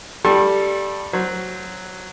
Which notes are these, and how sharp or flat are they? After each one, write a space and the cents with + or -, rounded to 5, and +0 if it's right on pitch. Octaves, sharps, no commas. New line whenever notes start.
G3 +0 A4 +0 C6 +45
F#3 +0 C5 +0